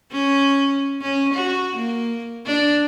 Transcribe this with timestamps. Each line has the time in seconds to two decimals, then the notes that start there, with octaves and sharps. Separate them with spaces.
0.12 C#4
1.02 C#4
1.34 F#4
1.76 A#3
2.46 D4